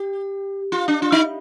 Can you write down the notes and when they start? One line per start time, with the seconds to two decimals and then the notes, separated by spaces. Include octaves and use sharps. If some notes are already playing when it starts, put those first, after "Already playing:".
Already playing: G4
0.72 F4
0.88 D4
1.02 F4
1.12 D#4